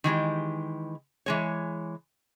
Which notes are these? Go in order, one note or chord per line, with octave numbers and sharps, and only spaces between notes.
D#3 E3 G#3 G4
E3 G#3 C#5